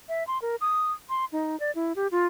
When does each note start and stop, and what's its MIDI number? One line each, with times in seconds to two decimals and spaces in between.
0.09 0.26 76
0.27 0.40 84
0.42 0.56 70
0.61 0.92 87
1.09 1.25 84
1.32 1.58 63
1.60 1.71 74
1.75 1.93 64
1.96 2.07 67
2.11 2.27 65